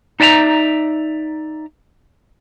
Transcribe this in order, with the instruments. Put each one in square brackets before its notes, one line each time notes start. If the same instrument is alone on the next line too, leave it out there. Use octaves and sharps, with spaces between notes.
[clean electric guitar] D#4 D5 E5 A5 A#5